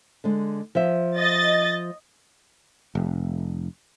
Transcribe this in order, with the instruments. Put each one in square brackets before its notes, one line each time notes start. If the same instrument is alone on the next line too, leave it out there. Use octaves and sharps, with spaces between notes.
[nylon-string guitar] D3 G#3
F3 E5
[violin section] D#5 A6
[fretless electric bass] F1